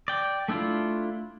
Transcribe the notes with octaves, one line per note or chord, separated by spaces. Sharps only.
D5 G5
A3 D4 E4 F4